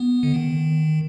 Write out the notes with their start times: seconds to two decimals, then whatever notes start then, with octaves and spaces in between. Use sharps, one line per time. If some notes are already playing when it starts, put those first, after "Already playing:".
Already playing: B3
0.23 D3
0.34 D#3